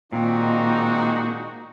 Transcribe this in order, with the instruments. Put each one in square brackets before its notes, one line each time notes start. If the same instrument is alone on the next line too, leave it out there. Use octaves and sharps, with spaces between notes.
[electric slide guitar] A#2 [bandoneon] D#3 A#3 C4 [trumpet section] G#3 D4 F#4 [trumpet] D#4